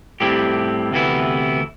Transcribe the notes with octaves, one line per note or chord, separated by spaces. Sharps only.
A2 G3 C4 E4 G4
D2 C3 E3 B3 E4